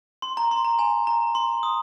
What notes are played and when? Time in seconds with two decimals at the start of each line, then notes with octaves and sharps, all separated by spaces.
0.22 C6
0.37 A#5
0.51 C6
0.65 A#5
0.79 G#5
1.07 A#5
1.35 C6
1.63 D#6